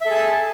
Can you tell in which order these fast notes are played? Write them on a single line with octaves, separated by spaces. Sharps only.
E5 A4 G#4 A5